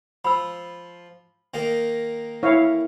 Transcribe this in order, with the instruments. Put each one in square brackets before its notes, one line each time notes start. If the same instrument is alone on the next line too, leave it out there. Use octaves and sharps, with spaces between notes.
[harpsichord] F3 [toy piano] B5 E6
[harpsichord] D#3 A#3 D#4
[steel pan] E4 C#5 F5